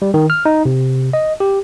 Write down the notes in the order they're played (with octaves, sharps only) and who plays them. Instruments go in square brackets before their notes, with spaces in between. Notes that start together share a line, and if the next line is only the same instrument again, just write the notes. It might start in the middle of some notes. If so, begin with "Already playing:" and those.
[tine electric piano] G3
D#3
F6
D#4
C3
D#5
G4